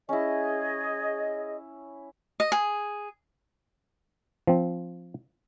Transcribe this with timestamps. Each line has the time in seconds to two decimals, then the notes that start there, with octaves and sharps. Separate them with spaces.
0.09 C#4 E4 G#4 D#5
2.40 D#5
2.52 G#4
4.47 F3 C4